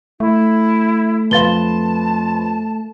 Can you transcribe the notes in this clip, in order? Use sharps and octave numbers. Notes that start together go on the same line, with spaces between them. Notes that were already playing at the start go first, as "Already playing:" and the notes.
A3 E4
F2 B4 F5 A5 C6 A6 G7